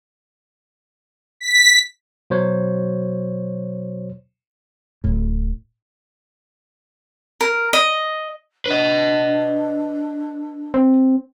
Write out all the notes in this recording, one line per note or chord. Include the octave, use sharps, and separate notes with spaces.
B6
B2 F#3 C5 C#5
D1 A2
A#4
D#5
D4 B4 D#5
C4